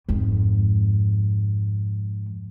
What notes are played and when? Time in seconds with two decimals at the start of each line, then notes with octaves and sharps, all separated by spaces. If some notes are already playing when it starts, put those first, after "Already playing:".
0.09 F2 G#2